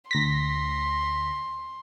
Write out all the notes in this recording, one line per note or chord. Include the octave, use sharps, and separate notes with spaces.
D2 C6 A#6 B6